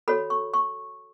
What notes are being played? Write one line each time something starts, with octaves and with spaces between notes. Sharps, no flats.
F#4 A4 C#5 B5
C#6
C#6